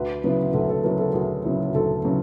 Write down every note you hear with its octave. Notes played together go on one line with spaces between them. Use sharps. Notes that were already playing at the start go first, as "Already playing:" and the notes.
Already playing: D2 B4
C#3 F#3 B3 E4
D2 A4
A4
C#3 F#3 B3 E4 A#4
A4
D2 G#4
C#3 F#3 B3 E4
D2 A4
C#3 F#3 B3 E4